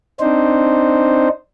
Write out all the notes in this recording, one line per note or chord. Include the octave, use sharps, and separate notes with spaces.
C4 D4 D#4 C5